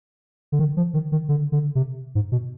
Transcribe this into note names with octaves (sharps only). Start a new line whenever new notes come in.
D3
D#3
F3
D#3
D#3
D3
D3
C3
G#2
B2